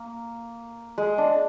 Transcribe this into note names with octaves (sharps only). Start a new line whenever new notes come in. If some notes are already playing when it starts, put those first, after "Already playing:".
Already playing: A#3
G#3
D4